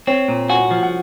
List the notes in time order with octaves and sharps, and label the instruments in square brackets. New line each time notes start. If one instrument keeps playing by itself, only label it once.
[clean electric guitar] C4 [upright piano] C#5
[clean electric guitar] A#2
[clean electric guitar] F#4 [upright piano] G#5
[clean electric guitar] F3
[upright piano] F#5